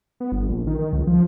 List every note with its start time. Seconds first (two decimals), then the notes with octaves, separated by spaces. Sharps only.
0.20 B3
0.32 G1
0.49 A#1
0.67 D#3
0.79 D#3
0.93 C#2
1.07 F3